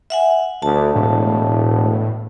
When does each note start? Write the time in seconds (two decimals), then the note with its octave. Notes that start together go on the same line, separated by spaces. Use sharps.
0.10 E5 F#5 G#5
0.62 D2 A5
0.95 E1 A2